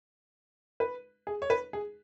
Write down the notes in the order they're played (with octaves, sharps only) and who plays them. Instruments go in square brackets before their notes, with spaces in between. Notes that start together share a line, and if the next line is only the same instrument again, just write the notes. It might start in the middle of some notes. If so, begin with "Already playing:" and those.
[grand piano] B4
G#4
C#5
B4
G#4